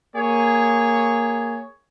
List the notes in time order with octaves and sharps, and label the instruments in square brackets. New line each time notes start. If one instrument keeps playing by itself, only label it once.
[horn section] A#3 G#4 C#5